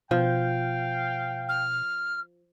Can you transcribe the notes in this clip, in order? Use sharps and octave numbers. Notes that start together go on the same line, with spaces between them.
B2 F3 F5 G5
F6